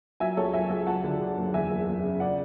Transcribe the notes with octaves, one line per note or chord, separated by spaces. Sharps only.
F#3 E5 G#5
C#2 A4 C#5
F#3 E5 G#5
C#2
F#3 F#5 A5
D3
D3
F#1
E2 E5 G#5
F#1
F#1
C#3
C#3 D5 F#5